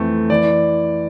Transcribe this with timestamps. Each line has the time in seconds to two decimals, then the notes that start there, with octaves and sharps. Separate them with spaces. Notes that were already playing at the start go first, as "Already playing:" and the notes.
Already playing: F2 E3 A3 C4
0.30 E3 D5